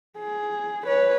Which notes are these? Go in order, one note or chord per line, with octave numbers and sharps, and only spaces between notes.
G#4
B4 C#5